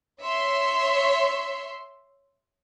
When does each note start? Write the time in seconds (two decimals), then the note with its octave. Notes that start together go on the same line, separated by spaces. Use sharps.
0.22 C#5 E5 C6